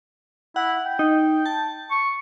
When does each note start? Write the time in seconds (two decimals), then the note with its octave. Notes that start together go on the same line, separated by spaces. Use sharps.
0.56 E4 F#5
0.86 G5
0.99 D#4
1.46 A5
1.91 C#6